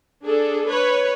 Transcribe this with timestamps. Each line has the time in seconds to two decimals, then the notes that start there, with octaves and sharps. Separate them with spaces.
0.25 D4 G#4 A4
0.68 B4 C#5